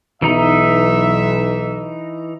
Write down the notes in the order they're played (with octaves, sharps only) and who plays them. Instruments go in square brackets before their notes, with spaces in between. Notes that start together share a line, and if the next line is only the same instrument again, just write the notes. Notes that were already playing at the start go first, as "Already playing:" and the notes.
[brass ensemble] B1 E5 [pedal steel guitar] E3 D#4 A#5